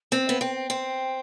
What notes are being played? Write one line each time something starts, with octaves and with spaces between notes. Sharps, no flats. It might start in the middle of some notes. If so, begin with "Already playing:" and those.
C4 C5
B3 E5
C4 G5
G5
C4